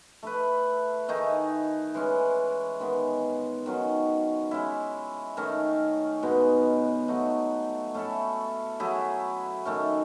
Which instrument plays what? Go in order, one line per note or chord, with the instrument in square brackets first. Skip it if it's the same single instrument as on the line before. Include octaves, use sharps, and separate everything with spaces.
[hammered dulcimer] A3 E4 B4
D#3 A3 D#4 G#4
E3 G#3 C#4
D#3 G#3 B3
D#3 F#3 C#4
G#3 C#4 E4
D#3 A3 C#4
B2 G#3 B3 D#4
F#3 A3 D#4
A3 C#4 E4 A4
F#3 A3 E4 G#4
D#3 A3 C#4